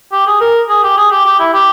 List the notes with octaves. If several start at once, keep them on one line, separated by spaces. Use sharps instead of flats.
G4
G#4
A#4
G#4
G4
G#4
G4
G4
E4
G4